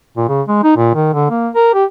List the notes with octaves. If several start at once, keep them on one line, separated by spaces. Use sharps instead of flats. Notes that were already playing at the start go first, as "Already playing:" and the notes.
A#2
C#3
G#3
D#4
A#2
D#3
D3
A#3
A#4
G4